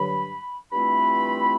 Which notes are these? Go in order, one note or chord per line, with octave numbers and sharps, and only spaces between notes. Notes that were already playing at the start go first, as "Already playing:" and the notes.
Already playing: G2 D3 F#3 B5
G2 E3 A3 C4 F4 B5